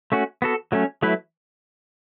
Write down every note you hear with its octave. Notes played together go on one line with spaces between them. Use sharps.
A3 C#4 F#4
B3 F#4 A4
F#3 A3 C#4
F#3 A3 E4 B4